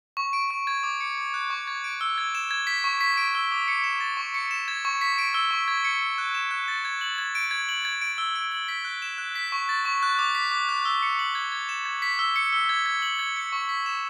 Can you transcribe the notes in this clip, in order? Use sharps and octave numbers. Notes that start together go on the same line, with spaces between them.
C#6
D7
C#6
G#6
D6
C#7
D6
F#6
C#6
G#6
D7
E6
G#6
E7
G#6
B6
C#6
B6
D7
E6
D6
C#7
E7
A6
C#6
C#7
E7
G#6
C#6
B6
D7
E6
C#6
G#6
C#7
E6
F#6
E7
F#6
A6
G#6
F#7
G#6
D7
G#6
F#7
G#6
D7
E6
D7
F#7
B6
F#6
E7
F#6
B6
C#6
A6
C#6
F#6
D6
B6
D6
F#6
E6
C#7
F#7
G#6
G#6
E7
G#6
B6
E6
C#7
E6
G#6
G#6
F#7
G#6
C#7
C#6
B6
E7